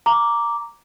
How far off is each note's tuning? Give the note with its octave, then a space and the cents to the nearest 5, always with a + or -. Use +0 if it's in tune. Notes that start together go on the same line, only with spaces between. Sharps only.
A#5 +0 D6 -5